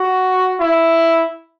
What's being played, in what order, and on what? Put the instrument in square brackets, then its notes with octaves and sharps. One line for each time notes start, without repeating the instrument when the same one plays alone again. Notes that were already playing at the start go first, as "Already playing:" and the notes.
Already playing: [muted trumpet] F#4
E4